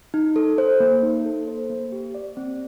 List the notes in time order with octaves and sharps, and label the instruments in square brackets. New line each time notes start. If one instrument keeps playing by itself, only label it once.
[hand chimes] D#4
A4
C5
A#3
D#4
A4
C5
A#3
G4
D5
C4